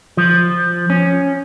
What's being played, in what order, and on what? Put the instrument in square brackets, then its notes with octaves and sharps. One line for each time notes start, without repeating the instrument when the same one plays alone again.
[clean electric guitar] F3
C#4